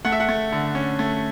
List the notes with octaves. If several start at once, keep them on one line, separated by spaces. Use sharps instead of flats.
A3 F#5
E5
F#5
A3
D3
C#4
A3